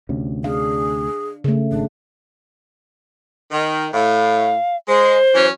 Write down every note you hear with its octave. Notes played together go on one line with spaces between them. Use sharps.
D2 C3 C#4
D4 G#4 F5
C#3 A3
G#1 D4
D#3
A2 F5
G#3 C5
E3 F#3 C#4